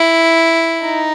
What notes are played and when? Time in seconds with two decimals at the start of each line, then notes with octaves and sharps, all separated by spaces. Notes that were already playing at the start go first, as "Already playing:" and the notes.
Already playing: E4
0.83 D#4